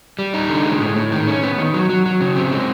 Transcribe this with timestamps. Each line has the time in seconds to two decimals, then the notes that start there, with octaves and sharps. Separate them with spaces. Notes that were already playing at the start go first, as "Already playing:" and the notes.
0.19 G3
0.34 D#4
0.49 D3
0.65 G#3
0.80 A2
0.96 A2
1.12 D#3
1.28 C#4
1.43 B3
1.58 D#3
1.74 F#3
1.90 F#3
2.06 F#3
2.21 C#3
2.36 C4
2.52 G#3